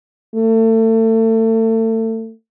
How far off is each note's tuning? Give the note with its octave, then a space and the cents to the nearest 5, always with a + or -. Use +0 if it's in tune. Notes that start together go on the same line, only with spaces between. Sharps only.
A3 +30